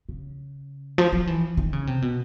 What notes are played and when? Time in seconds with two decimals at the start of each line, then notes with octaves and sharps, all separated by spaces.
0.09 C#3
0.98 F3
1.13 F3
1.27 E3
1.57 D#3
1.73 C#3
1.87 C3
2.02 B2